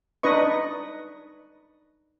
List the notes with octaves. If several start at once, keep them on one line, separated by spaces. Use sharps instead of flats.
D4 D#4 B4 D#5 C#6